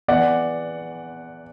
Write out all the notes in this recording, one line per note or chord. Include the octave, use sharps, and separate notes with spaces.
E2 E3 D5 F#5